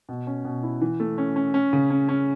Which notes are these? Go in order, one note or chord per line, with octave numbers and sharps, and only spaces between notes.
B2
C#4
B2
E4
E3
A3
C#4
C#4
C#4
C#3
C#4
C#4